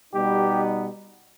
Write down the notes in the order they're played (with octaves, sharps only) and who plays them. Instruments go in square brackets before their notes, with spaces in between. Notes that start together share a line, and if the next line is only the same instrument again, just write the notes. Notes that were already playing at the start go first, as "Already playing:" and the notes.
[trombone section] B2 G3 B3 D#4 [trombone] G4